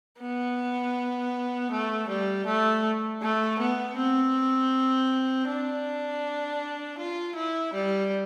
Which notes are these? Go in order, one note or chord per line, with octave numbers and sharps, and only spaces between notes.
B3
A3
G3
A3
A3
B3
C4
D4
F4
E4
G3